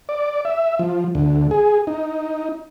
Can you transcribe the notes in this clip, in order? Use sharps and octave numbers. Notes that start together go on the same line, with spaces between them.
D5
E5
F3
D2
G#4
D#4